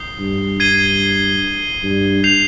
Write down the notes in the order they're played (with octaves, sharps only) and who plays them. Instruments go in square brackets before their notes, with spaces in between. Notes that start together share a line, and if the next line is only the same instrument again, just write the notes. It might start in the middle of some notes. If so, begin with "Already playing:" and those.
Already playing: [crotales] D#6 G6 C7 G7
[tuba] G2
[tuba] G2 [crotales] G#6 C7 D#7 G7
[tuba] G2
[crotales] G6 C7 F7